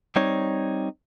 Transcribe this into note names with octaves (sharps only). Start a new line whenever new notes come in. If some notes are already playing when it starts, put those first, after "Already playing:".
G3 C4 D#4 C#5